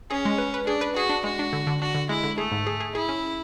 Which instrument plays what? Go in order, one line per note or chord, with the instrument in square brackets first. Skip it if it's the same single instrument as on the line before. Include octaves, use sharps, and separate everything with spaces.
[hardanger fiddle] C#4 [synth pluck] G#4
[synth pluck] G#3
B4
B4
[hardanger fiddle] D4 [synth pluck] G#4
[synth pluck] B4
[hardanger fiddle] F#4 [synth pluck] G#4
[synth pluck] D4
[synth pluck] G#3 [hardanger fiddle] F#4
[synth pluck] D4
D3
D3
[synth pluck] D4 [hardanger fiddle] F#4
[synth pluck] D3
[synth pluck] G#3 [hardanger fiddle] E4
[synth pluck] D3
[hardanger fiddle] A3 [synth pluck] G#4
[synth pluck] G#2
G#4
G#4
[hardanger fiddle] E4 [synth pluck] G#4
[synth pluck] C#4